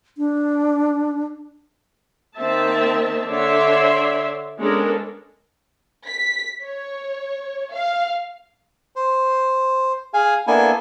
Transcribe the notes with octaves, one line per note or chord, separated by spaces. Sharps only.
D4
D#3 A#3 C4 E5 A5
D3 C#5 D5 E5 C6
G#3 B3 C#4 D4 A4 A#4
B6
C#5
F5
C5
G#4 F5 G#5
A#3 B3 D4 E4 A4 G#5